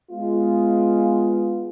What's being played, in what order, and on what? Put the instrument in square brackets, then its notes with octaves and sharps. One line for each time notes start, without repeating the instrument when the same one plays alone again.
[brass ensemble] G#3 B3 F4